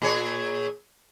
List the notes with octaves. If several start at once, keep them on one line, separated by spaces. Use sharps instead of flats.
A#2 G#4 C#5